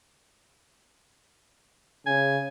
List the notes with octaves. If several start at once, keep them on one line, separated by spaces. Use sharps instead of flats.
C#3 G#5